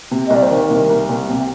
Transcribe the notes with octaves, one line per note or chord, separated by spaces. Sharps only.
C3
D#5
C2 D5
C5
D#3 A#4
C2
C2
C2
C3